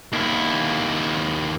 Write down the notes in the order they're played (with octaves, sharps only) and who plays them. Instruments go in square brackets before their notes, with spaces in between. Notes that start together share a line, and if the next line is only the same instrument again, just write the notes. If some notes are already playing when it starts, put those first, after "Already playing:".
[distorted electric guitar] D#2 E4